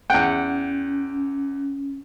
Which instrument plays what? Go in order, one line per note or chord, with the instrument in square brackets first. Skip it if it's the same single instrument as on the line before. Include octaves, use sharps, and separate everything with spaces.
[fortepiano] E2 G5 [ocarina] C#4 [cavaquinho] F#5